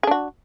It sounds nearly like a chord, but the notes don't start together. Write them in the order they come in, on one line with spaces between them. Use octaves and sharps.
G#4 D4 F#4